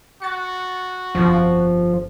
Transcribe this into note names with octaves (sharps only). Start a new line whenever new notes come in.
F#4 A6 C#7
G1 F2 F3